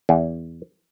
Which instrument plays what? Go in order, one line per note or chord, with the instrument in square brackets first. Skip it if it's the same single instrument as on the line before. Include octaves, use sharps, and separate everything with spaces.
[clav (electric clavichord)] E2